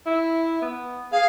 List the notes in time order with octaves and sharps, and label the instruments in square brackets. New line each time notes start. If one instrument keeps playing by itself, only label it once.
[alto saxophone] E4
B3
[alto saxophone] G#4 [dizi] F5